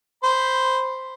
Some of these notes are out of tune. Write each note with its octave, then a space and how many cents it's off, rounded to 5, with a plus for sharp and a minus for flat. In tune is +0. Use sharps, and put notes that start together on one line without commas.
C5 +0 B5 +0